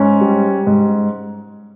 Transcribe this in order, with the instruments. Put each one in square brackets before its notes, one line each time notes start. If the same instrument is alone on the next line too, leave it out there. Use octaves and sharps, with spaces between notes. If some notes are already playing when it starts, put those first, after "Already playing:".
Already playing: [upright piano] G#2 C#4
G3
G#2